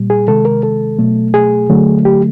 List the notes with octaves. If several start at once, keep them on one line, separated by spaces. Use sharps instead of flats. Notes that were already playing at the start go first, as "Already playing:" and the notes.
Already playing: A#2 G3
G#4
C3 D#3 G#3 A4
A#4
A4
B2 F#3 A3
G#4
D3 F#3 A3
G4